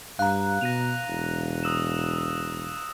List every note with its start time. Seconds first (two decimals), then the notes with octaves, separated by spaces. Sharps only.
0.19 G2 F5 A#5 F#6
0.61 B2 A#6 D#7 F7
1.08 E1
1.64 D#6 E6 E7